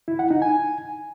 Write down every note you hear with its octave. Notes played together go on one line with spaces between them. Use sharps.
E4
F#5
D#4
G#5